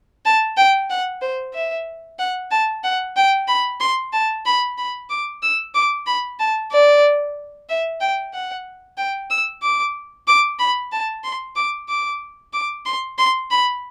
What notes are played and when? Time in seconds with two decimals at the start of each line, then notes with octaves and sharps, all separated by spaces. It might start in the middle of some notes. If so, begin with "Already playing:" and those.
0.25 A5
0.57 G5
0.90 F#5
1.21 C5
1.54 E5
2.19 F#5
2.51 A5
2.84 F#5
3.16 G5
3.48 B5
3.80 C6
4.13 A5
4.46 B5
4.78 B5
5.10 D6
5.42 E6
5.74 D6
6.06 B5
6.40 A5
6.72 D5
7.69 E5
8.01 G5
8.33 F#5
8.97 G5
9.30 E6
9.62 D6
10.27 D6
10.59 B5
10.92 A5
11.24 C6
11.56 D6
11.89 D6
12.53 D6
12.86 C6
13.18 C6
13.50 B5